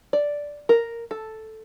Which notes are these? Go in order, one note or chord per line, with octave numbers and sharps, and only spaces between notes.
D5
A#4
A4